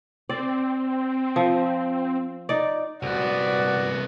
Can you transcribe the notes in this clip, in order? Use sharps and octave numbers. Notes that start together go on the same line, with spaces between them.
C4 D5
F3
D#4 D5
C2 B3 F#4 D5